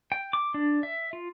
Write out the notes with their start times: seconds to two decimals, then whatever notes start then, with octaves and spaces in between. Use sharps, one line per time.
0.12 G5
0.33 D6
0.54 D4
0.83 E5
1.13 F4